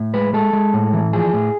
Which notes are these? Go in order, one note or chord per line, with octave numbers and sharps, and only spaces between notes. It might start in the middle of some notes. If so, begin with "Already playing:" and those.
Already playing: A2
G#3 B4
G#3 A4
G#3
A2
E3
F3 G#4
A2